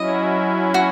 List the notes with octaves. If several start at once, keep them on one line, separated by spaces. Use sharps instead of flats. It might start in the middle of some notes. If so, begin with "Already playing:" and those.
Already playing: F#3 C#4 E4 D#5
F#4